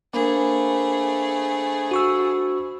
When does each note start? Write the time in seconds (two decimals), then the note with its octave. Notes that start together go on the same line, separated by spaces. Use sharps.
0.13 A3 A#3 D4 G#4 C5 B5
1.91 F#4 C#6 E6